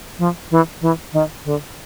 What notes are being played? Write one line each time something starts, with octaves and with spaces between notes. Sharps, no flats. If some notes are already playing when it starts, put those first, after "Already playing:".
F3
E3
E3
D#3
D3